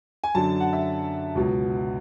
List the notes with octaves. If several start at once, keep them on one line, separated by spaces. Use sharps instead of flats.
G#5
F#2 D3 F#3 A5
F#5
E5
C#2 B2 F#3